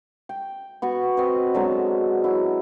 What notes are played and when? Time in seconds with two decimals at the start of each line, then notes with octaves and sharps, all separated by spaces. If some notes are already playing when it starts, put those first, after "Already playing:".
0.29 G5
0.82 B3 F#4 C#6
1.17 C4 B4 D#5
1.54 D3 F#3 G#3 B3
2.24 F#3 E4